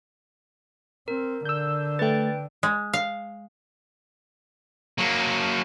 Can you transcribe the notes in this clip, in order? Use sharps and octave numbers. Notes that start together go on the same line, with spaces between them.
C4 A#4
D3 E6 G6
A3 B4 G5 A6
G#3
F5
F#3 A#3